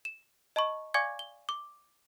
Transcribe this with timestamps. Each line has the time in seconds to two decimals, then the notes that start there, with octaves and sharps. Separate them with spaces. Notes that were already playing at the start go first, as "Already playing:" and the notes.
0.05 E7
0.56 D#5 A5 B5 C#6
0.94 D5 F5 G#5 C#6 D6 G#6
1.19 G7
1.49 D6